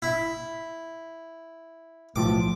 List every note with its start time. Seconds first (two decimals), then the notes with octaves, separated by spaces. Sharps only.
0.02 E4
2.16 B1 A2 F3 D6